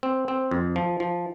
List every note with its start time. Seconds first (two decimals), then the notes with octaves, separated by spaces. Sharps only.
0.03 C4
0.28 C4
0.51 F2
0.76 F3
1.00 F3